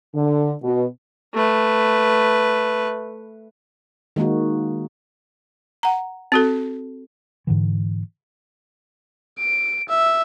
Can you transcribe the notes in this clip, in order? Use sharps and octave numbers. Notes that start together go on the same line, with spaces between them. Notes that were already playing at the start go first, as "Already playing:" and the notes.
D3
B2
A3 B4
D#3 G#3 A#3 D#4 F#4
F#5 A#5
C4 F#4 A4
G#2 D3 E3
D7
E5